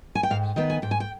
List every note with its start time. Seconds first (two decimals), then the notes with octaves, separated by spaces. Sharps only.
0.15 G#5
0.23 G5
0.30 G#2 F5
0.56 D#3 B3 G5
0.70 G#5
0.82 G#2 G5
0.91 G#5
1.00 G5